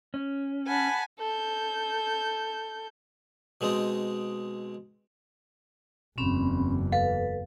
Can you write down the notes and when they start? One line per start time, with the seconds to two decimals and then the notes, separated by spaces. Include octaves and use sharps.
0.14 C#4
0.67 F#5 G#5 A5 B5
1.19 A4 G6
3.61 B2 G#3 C4 D#4
6.18 F#1 E2 C4 C#4 B5
6.92 A4 B4 F5